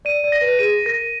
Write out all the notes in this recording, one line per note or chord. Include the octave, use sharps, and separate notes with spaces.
D5 D#7
D5
A#6
B4
G#4 D#7
A#4 A#6